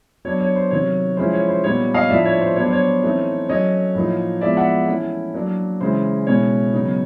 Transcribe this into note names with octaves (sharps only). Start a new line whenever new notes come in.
F#3 B3 D4 C#5
C#5
C5
C3 D#3 F#3 C#5
F3 G#3 C#4 E4 C5
C#5
C5
A#2 G3 B3 D#4 C#5
D#5 F5
A2 F3 A3 D4 D5 E5
C#5
C5
F#3 B3 D4 C#5
C5
C#5
E3 A3 C4 D#4
F#3 A3 C#4 C#5 D#5
A2 F3 A#3 D#4
F3 G#3 B3 E4 D5 E5
E5 F#5
E3 A3 C#4 E4
F#3 A#3 D4
C#3 E3 G#3 C#4 E4 C5
B2 G#3 C#4 E4 C#5
C#3 F#3 B3 D#4